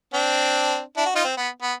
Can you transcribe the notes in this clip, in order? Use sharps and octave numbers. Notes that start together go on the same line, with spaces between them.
C4 D4
D4 E4
F#4
D#4 F4
C4
B3
B3